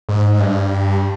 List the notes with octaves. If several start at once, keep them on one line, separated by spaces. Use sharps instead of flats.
G#2
G2